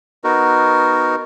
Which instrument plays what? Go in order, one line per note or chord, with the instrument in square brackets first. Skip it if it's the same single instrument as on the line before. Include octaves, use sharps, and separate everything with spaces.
[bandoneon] B3 D#4 F#4 A#4